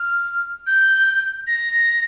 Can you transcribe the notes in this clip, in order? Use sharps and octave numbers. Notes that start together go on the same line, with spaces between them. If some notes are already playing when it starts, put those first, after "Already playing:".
Already playing: F6
G6
A#6